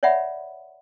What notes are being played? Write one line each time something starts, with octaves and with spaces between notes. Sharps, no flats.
C#5 D5 E5 F#5 B5